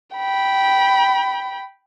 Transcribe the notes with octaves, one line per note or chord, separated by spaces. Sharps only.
G5 B5